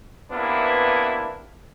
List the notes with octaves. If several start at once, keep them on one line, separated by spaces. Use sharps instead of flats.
C3 A#3 B3 D4 E4 B4